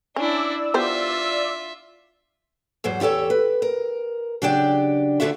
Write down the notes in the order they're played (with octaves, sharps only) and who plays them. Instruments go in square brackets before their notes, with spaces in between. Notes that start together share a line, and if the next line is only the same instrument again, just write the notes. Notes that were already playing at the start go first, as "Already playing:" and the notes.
[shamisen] C#4 [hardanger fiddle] D4 E4 [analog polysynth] D5 E6
[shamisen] B3 G4 C5 [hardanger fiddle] F4 E5
[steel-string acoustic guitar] E2 G#2 F#3 C5
E2 F4 G4 A4 C#5
B4
A#4
C#3 F#3 D4 G4 D5 G5
D2 B2 D3 F4 F#4 E5